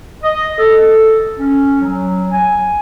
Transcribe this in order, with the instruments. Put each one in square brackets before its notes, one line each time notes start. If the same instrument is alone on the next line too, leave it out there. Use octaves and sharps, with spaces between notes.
[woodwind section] D#5
A4
C#4
F#3
G#5